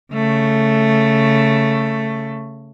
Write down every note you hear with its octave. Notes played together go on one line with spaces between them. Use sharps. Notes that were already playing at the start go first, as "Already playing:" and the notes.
C#3 A3